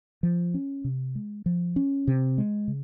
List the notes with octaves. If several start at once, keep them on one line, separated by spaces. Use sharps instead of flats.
F3
C#4
C3
G#3
F3
C#4
C3
G#3
C#3